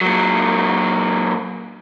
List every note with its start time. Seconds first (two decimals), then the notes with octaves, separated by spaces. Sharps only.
0.01 A#2 F#3